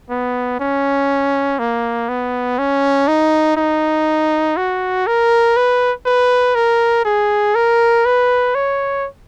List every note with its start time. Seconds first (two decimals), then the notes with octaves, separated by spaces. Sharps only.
0.10 B3
0.60 C#4
1.59 A#3
2.09 B3
2.59 C#4
3.08 D#4
3.57 D#4
4.57 F#4
5.07 A#4
5.57 B4
6.06 B4
6.55 A#4
7.05 G#4
7.55 A#4
8.05 B4
8.55 C#5